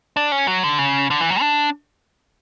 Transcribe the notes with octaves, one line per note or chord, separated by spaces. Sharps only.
D4
C#4
F#3
D3
C#3
D3
E3
F#3
D4